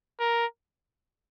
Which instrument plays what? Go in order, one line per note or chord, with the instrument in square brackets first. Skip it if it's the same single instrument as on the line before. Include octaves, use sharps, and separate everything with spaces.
[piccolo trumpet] A#4